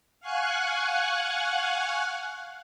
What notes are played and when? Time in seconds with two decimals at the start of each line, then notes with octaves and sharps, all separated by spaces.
0.20 F5 F#5 G#5 C#6 F#6